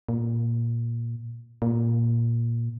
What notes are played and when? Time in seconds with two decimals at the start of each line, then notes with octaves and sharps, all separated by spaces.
0.09 A#2
1.62 A#2